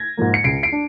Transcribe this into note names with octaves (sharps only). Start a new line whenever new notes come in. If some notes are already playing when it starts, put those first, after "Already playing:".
Already playing: G#6 A#6
G#2 F3 A#3
C#7
C#2 C7 D7
C7 D7
D4